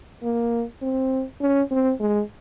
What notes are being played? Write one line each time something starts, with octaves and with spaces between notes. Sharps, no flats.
A#3
C4
C#4
C4
G#3